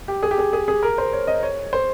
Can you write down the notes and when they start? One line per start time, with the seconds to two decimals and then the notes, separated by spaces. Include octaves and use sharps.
0.08 G4
0.23 G#4
0.31 G4
0.38 G#4
0.53 G#4
0.68 G#4
0.83 A#4
0.98 C5
1.13 C#5
1.27 D#5
1.43 C#5
1.73 C5